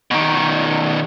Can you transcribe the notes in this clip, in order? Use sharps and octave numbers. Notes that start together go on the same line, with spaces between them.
B2 D#3